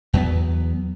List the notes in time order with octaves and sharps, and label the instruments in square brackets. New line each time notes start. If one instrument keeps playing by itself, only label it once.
[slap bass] E2 F#3 G#3 B3